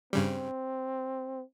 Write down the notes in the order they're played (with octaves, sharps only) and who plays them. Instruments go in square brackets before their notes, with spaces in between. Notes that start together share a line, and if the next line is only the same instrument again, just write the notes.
[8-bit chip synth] G2 C#3 G3 [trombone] C4